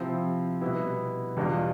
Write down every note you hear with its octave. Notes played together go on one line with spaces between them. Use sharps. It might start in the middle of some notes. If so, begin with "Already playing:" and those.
Already playing: C3 F3 C4 E4
B2 G3 B3 E4
E2 B2 G3 D4 F4